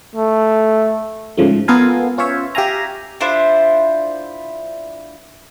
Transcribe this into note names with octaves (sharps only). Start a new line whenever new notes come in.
A3
G#2 C#3 F3 A3
B3 F4 A4 A#4 F5 G#5
C#4 F4 C5 C#5 E5
G4 E5 F5 G#5 A#5
D4 E4 F4 C5